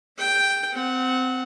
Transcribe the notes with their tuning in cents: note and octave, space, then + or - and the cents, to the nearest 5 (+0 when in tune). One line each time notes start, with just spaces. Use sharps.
G#4 -35 G5 +0
C4 -20 F#5 +0